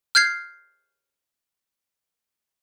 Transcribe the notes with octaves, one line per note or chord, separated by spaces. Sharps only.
F6 G6 G#6 C7